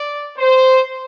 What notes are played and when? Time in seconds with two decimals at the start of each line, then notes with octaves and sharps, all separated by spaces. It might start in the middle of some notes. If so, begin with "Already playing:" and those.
Already playing: D5
0.38 C5